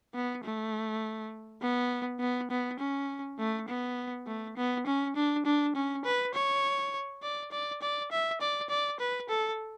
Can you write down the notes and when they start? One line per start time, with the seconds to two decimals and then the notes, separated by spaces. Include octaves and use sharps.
0.14 B3
0.44 A3
1.62 B3
2.20 B3
2.51 B3
2.79 C#4
3.39 A3
3.68 B3
4.27 A3
4.57 B3
4.86 C#4
5.16 D4
5.45 D4
5.75 C#4
6.05 B4
6.34 C#5
7.23 D5
7.51 D5
7.82 D5
8.11 E5
8.41 D5
8.70 D5
9.00 B4
9.29 A4